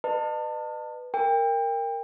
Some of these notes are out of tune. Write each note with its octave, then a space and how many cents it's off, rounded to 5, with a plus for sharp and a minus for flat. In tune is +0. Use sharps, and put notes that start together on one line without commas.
B4 +10 D#5 -45 A5 +30
A#4 -10 G5 +30